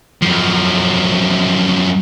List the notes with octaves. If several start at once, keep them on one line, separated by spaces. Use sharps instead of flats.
F#2 F3